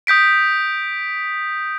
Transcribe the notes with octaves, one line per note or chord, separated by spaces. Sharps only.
D#6 G6 B6 D7